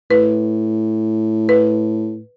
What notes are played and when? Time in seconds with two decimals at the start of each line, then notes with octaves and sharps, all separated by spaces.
0.10 A2 B4
1.49 B4